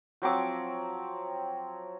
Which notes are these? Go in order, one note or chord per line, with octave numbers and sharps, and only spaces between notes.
F3 F#3 C4 D6